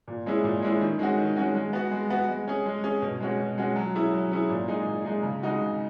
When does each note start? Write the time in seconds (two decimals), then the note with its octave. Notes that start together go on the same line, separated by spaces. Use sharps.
0.08 A#2
0.26 G#3 C#4 E4 G#4
0.44 A#2
0.62 G#3 C#4 E4 G#4
0.81 D#3
0.99 G#3 C#4 F#4
1.18 D#3
1.37 G#3 C#4 F#4
1.55 G#3
1.73 B3 F#4
1.92 G#3
2.10 B3 F#4
2.28 G#3
2.48 C#4 G#4
2.66 G#3
2.84 C#4 G#4
3.02 B2
3.20 G#3 C#4 F#4
3.39 B2
3.58 G#3 C#4 F#4
3.76 F#3
3.95 C#4 E4 G#4
4.13 F#3
4.31 C#4 E4 G#4
4.50 A#2
4.68 G#3 D#4 G#4
4.86 A#2
5.05 G#3 D#4 G#4
5.23 C#3
5.43 G#3 D#4 F#4
5.61 C#3